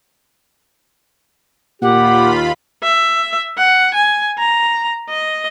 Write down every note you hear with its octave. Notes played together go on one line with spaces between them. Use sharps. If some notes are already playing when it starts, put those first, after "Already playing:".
D#2 A#2 F4 G4 F#5 B5
E5
F#5
G#5
A#5
D#5